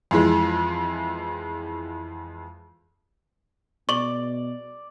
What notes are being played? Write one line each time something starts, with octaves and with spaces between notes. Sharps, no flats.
F2 E3 G#3
B2 D5 C#6 F#7